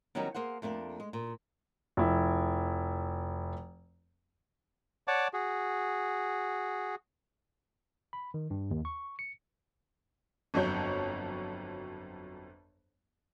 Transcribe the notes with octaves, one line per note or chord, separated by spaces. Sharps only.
D#3 F#3 G3 B3 C#4 D#4
A#3 G#4 C5 F#5
F2 A3 A#3 D4
G#3
A#2
F1 E4
C#5 D5 F#5 A5 D6
F#4 G#4
B5
D#3
G2
D#2
C#6
C#7
G1 F2 F#3 C#5 G6